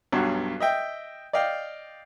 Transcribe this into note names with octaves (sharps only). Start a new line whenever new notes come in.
B1 G2 B2 F#3
D#5 E5 G5
D5 D#5 F5 G5